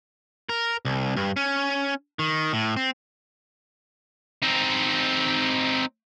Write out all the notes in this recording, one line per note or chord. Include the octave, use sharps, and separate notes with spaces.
A#4
C2
G2
C#4
D#3
A2
C4
C4 D#4